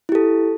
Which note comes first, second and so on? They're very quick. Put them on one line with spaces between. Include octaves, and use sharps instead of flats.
E4 G4 A4